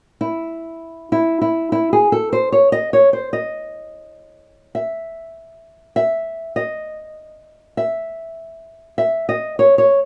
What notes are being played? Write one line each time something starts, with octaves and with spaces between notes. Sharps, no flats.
E4
E4
E4
E4
G#4
A4
C5
C#5
D#5
C#5
C5
D#5
E5
E5
D#5
E5
E5
D#5
C#5
C#5